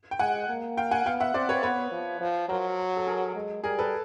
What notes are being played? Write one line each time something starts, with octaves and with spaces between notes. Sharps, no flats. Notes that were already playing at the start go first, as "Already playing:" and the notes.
G5
G#3 F#5 G#5
A#3
F5 G5
F#5 G#5
B3 F5 G5
E5 F#5
C4 C5 D5
B4 C#5
B3 B4 C#5
F3
F3
F#3 A#4 C5
A4
G#4 A#4
G#3
G3 G#4 A#4
A4 B4